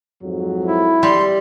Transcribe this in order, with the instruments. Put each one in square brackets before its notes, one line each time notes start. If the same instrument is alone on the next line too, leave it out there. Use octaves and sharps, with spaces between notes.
[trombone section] F2 G#2 F#3
[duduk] E4
[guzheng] G3 [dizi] C6